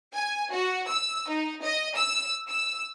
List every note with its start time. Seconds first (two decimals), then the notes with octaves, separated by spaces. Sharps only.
0.14 G#5
0.51 F#4
0.87 E6
1.28 D#4
1.63 D#5
1.96 E6
2.48 E6